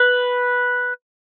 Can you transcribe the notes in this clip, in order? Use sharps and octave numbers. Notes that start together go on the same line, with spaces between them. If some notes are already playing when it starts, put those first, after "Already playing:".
Already playing: B4